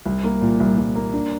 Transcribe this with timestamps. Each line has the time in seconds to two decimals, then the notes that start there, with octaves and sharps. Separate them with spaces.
0.06 C2
0.24 A#3
0.41 A#2
0.60 C2
0.78 C2
0.95 A#3
1.13 D4